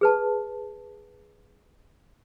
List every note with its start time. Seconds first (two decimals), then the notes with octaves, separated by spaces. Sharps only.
0.01 G#4 B4 A5